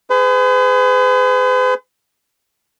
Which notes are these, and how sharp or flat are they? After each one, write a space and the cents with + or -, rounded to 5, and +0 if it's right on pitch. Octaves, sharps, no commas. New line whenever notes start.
G#4 +0 B4 +45